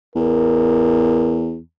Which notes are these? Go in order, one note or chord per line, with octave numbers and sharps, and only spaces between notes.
E2 A#4